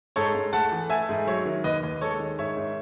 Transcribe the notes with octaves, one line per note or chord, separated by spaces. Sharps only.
G#2 A4 C#5
G#2
A3 F#5 A5
E3
A3 E5 G#5
G#2
F#3 C#5 E5
D#3
D#2 B4 D#5
D#2
G#3 A4 C#5
D#3
G#2 C#5 E5
G#2